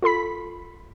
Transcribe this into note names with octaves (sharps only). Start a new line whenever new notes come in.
F4 A4 B5 B6